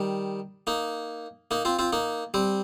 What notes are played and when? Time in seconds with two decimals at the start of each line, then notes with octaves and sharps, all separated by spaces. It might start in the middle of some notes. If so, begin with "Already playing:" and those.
Already playing: D#3 G3
0.67 A#3 D#4
1.51 A#3 D#4
1.65 C4 F4
1.79 C4 F4
1.93 A#3 D#4
2.34 G3 C4